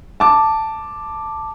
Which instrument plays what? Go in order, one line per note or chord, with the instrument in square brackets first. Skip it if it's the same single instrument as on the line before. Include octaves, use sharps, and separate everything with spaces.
[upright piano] A5 D6